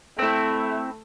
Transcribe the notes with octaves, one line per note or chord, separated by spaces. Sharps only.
A3 C4 E4